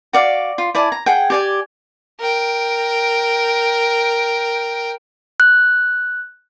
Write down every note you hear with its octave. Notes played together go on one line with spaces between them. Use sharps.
F#4 D5 F5
F4
E4 D5 G#5 A5
A#5
G#4 F#5 G5
G4 D5 G#5
A#4 G5
F#6